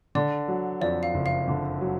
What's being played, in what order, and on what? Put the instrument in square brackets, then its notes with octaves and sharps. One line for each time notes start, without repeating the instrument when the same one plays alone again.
[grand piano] D3 [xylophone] D5
[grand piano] F#3
[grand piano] F2 [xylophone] D5
[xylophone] F5
[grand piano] F#1
[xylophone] F5
[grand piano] D3
F#3